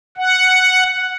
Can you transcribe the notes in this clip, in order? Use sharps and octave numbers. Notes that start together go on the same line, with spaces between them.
F#5